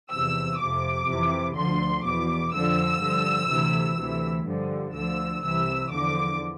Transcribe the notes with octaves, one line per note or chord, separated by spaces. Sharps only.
E2 C3 F3 E6
F2 C3 F3 D6
F2 C3 E3
D2 D3 F3 C6
E2 B2 D6
F2 D3 F3 E6
G2 D3 F3
D2 C3 E3
D2 C3 E3
G2 D3 F3
D2 D3 F3 E6
C2 C3 E3 E6
E2 D3 F3 D6